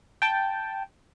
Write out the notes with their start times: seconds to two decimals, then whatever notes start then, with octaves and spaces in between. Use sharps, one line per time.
0.22 G5 A5